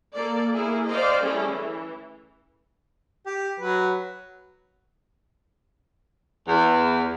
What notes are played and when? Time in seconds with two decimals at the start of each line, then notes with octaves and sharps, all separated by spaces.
0.14 A#3 A4 D5
0.53 A#3 E4 G#4
0.88 C5 D5 D#5 F5 G5
1.21 G3 A3 C#4 E4 G#4 A4
1.52 E3
3.26 G4
3.60 F#3 B4
6.48 E2